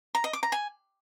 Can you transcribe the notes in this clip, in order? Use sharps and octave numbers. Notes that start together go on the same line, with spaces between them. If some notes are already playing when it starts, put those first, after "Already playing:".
A#5
D#5
D6
A#5
G#5